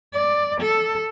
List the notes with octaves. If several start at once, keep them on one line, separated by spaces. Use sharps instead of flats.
D5
A4